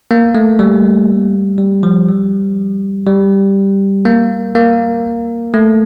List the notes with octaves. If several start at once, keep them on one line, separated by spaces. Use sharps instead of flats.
A#3
A3
G3
G3
F3
G3
G3
A#3
A#3
A3